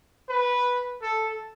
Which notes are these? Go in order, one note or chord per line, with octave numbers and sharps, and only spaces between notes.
B4
A4